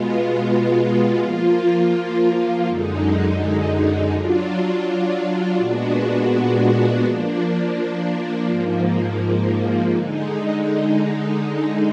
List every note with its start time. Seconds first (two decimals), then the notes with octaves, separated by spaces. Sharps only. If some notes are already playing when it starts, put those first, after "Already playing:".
Already playing: B2 G#3 B3 F4
1.23 F3 A#3 F4
2.67 F#2 D3 G#3 D#4
4.12 F#3 D4 F4
5.57 A#2 G#3 B3 D4 F#4
7.03 F3 A#3 D4
8.49 G#2 F3 A#3
9.94 D3 G#3 D#4